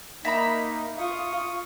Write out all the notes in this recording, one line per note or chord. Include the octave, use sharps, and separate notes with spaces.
A#3 D#4 E5 A#5 B5
F4 C#6 D#6